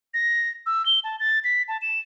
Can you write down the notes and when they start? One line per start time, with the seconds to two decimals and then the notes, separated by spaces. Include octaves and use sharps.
0.14 A#6
0.66 E6
0.86 G7
1.04 A5
1.20 A6
1.44 B6
1.68 A5
1.82 E7